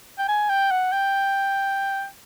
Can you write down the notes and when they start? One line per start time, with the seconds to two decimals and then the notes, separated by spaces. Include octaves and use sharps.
0.19 G5
0.28 G#5
0.50 G5
0.71 F#5
0.92 G5